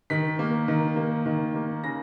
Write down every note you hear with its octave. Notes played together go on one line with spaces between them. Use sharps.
D#3 B6
A#3
D#3
A#3
D#3
A#3
C#3 A#6